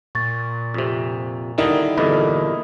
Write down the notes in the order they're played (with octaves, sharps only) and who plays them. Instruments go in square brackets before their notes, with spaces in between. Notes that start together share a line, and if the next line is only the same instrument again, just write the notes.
[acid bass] A#2 [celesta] C#6 A6
[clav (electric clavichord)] F2 C3
[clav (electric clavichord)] D3 D#3 G3 [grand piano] D#4 E4 A#4
[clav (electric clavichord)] E2 G2 A#2 [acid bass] D3 [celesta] A4 D#5 B5